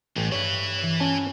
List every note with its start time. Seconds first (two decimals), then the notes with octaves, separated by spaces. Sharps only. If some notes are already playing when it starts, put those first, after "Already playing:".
0.16 A1 G2
0.32 G2 E4 B4 C#5
0.81 E3 A#6
1.00 C#4 F4 G5 A5